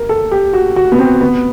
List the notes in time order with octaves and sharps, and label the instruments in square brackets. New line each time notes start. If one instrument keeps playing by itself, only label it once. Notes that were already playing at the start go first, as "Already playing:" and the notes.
Already playing: [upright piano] A#4
A4
G4
F#4
F#4
B3
C4
B3